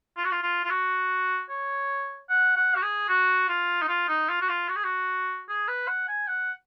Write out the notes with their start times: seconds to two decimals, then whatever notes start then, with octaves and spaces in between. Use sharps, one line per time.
0.17 F4
0.24 F#4
0.31 F4
0.43 F4
0.64 F4
0.70 F#4
1.49 C#5
2.29 F#5
2.56 F#5
2.75 F#4
2.82 G#4
3.08 F#4
3.48 F4
3.82 D#4
3.88 F4
4.08 D#4
4.29 F4
4.41 F#4
4.49 F4
4.69 F#4
4.76 G#4
4.84 F#4
5.49 G#4
5.68 B4
5.88 F#5
6.08 G#5
6.28 F#5